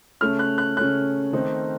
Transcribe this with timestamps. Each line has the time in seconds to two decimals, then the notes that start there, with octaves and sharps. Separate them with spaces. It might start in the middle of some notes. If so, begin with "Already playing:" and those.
0.21 C#3 A3 C#4 F6
0.39 F#6
0.58 F#6
0.77 C#3 A3 C#4 F#6
1.33 D#3 A3 C4 D#4